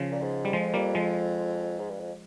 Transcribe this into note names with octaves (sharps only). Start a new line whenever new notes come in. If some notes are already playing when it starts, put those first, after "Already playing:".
Already playing: C#3 F3
A#2
G#2
G3
F2 F3 G#3
G3 A#3
F3 G#3
G#2
G2
F2